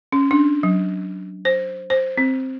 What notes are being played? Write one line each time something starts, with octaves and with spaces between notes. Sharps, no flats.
C#4
D4
F#3
C5
C5
C4